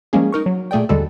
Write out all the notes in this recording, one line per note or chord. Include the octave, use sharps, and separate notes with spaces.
F3 G3 G#3 A#3 C#4 G#4
D#4 A#4 C#6
F#3
A#2 A3 G#4 D5 G5
D#2 D3 G3 G#3 F#4 A4